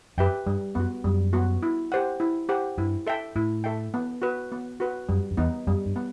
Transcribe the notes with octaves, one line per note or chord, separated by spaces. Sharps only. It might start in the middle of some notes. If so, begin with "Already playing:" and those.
F#2 G4 B4 E5 G5
G2 G3
F#2 B3 F#4
F#2 G3
B3 F#4
E4
G4 C5 F#5
E4
G4 C5 F#5
G2 E4
A4 E5 G5
A2 E4
A4 E5 G5
B3
F#4 B4
B3
F#4 B4
F#2 G3
F#2
E2 B3 D#4
F#2 G3
G2
B3